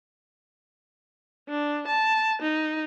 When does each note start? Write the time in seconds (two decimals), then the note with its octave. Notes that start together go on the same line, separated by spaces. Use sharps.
1.49 D4
1.87 A5
2.42 D#4